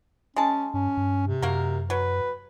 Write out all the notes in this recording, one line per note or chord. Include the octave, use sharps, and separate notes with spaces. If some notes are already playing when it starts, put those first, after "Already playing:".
G#3 C#4 A5
G2 C#4
G2
C3
F#2 A#3 F#4 A#4
F#3 B4